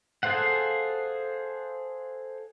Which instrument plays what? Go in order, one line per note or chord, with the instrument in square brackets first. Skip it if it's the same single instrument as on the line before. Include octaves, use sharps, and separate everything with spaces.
[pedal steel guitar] G#4 A4 C5 F5 F#5